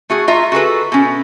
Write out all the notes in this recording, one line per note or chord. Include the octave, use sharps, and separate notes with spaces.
A3 F#4 G#4
F4 D#5 E5 A#5
F#4 G#4 A4 B4
B2 C#4